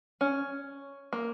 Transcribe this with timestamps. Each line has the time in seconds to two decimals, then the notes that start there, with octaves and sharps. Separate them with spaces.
0.21 C#4
1.13 A#3